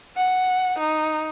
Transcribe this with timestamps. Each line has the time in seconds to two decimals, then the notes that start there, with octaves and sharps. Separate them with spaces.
0.17 F#5
0.79 D#4